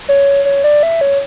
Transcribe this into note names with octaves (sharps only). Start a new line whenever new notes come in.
C#5
C#5
D5
E5
C#5